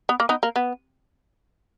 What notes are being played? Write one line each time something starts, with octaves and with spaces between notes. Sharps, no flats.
B3
A#3
B3 D#4
A#3
B3